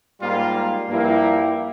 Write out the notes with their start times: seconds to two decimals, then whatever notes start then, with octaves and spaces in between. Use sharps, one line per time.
0.20 G#2 G3 A#3 F4
0.87 G2 F3 A#3 E4 G4